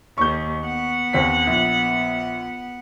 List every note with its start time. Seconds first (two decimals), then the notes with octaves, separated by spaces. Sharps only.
0.18 D#2 C#6 G6
0.62 B3 F#5
1.13 D#2 C4 B6
1.47 A#1